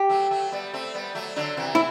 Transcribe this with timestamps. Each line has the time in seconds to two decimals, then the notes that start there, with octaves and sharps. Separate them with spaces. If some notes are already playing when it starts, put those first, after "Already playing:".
Already playing: G4
0.09 F#3 A3
0.31 F#3 A3
0.52 G3 B3
0.73 A3 C4
0.94 G3 B3
1.15 F#3 A3
1.36 D3 F#3
1.57 C3 E3
1.75 E4